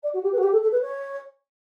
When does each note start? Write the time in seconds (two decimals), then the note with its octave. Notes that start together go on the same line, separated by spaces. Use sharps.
0.03 D5
0.14 F#4
0.23 G4
0.32 B4
0.38 F#4
0.43 G4
0.52 A4
0.62 A4
0.72 B4
0.81 C#5